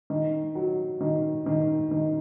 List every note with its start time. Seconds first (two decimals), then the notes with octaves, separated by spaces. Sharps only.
0.10 D#3
0.55 F#3
1.01 D#3
1.46 D#3
1.91 D#3